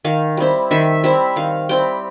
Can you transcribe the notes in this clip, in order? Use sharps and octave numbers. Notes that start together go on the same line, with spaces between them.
D#3 F5
G3 C4 E4
D#3 E5
G3 C4 E4 E5
D#3 F5
G3 C4 E4 G5